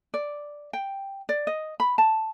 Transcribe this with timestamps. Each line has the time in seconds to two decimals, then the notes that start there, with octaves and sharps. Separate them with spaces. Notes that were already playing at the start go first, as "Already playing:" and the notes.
0.14 D5
0.73 G5
1.29 D5
1.47 D#5
1.80 B5
1.98 A5